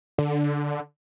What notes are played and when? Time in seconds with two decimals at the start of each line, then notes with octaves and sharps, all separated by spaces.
0.18 D3